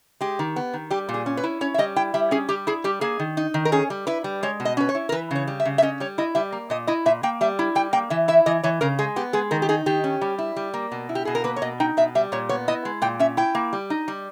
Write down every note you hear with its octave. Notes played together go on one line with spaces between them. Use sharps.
G#3 G4
D#3
B3
D#3
G3 G4
A#2
G#4
C#4
B4
E4
C#4 C#5
E5
G3 D#5
E4 G5
G3 E5
C#4 G#4
G3 G4
E4 G#4
G3 G4
A#3 G#4
D#3
D#4
D#3
A#4
C#4 G#4
G3
E4 B4
G3
G#3 C#5
B2
D#5
C#4 B4
C#5
E4
A#4
E3 B4
C#3 C#5
G3
E5
C#3
E5
C#4 D#5
G3 C#5
E4 D#5
G3 E5
A#3
A#2 D#5
E4 D#5
A#2 E5
A#3 G5
G3 E5
E4
G3 G5
A#3 G5
E3 E5
E4 E5
E3 D#5
E3 C#5
C#3 A#4
G#3 G#4
B3 G4
G#3 G#4
D#3 A#4
G4
D#4 G#4
D#3 G4
C#4
G3
E4
G3
A#3
B2
E4
G4
B2 G#4
A#4
A#3 B4
C#5
B2 D#5
D#4 G5
B2 E5
G3 E5
A#2 C#5
B3 C#5
E4 D#5
G#3
A#2 G5
C#4 E5
E4 G5
A#3
G3
D#4
G3